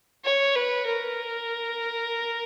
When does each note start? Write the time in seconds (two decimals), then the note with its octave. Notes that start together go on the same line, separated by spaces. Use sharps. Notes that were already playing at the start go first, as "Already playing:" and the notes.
0.24 C#5
0.55 B4
0.86 A#4